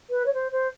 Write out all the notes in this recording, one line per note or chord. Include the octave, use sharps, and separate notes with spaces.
B4
C#5
C5
C5